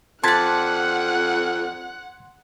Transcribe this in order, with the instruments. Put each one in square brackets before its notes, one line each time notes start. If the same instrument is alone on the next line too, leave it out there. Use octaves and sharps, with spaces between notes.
[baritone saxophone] F2 [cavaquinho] D5 A5 [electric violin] F#5 F#6 [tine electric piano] C6 G#6 B6